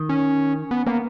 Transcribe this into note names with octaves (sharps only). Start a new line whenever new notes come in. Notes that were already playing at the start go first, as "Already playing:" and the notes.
Already playing: D#3
C#4
B3
A#3 B3